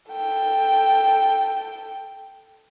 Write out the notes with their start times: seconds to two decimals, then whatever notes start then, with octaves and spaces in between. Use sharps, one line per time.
0.12 A4 G5